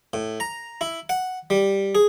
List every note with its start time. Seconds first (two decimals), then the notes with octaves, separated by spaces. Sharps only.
0.13 A2
0.40 A#5
0.81 E4
1.09 F#5
1.50 G3
1.95 G#4